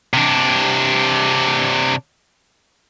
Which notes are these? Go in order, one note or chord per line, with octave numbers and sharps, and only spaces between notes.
C3 D4